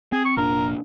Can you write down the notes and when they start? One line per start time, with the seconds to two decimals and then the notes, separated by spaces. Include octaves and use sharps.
0.12 C4 G#4
0.25 C#6
0.37 F1 A#2 D4 A#4